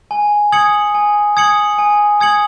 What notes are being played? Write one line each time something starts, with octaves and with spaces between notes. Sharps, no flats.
G#5
D#6 G#6 C#7 F#7
G#5
D#6 G#6 C#7 F#7
G#5
D#6 G#6 C#7 F#7